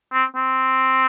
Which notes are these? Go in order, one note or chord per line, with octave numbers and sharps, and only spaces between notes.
C4
C4